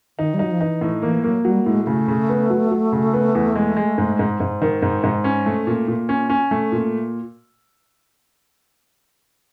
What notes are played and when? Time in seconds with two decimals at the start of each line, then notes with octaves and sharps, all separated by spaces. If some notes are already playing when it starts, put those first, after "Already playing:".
0.19 D#3 D#4
0.34 G3
0.39 F#3 D#4
0.51 F3
0.60 E3 D#4
0.81 A2
1.02 E3 A#3
1.24 F#3 A#3
1.45 F#3 G3
1.66 A2 G#3
1.87 C#3 A3
2.08 C#3
2.29 B3
2.50 F#3
2.71 F#3
2.92 C#3
3.13 B3
3.35 E2
3.56 G#3
3.77 G#3
3.98 G#2
4.19 G#2
4.40 G#2
4.62 D#3
4.82 G#2
5.04 G#2
5.24 C#4
5.46 A3
5.67 A#2
5.88 A#2
6.09 C#4
6.30 C#4
6.51 A3
6.72 A#2